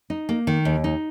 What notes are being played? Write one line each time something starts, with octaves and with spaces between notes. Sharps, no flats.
D#4
A#3
D#3
D#2
D#4